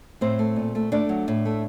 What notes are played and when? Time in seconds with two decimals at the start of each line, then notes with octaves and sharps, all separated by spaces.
0.21 A2 C4 C5
0.39 A3
0.56 A#2
0.75 A3
0.92 A3 D4 D5
1.09 F#3
1.28 A2
1.45 A3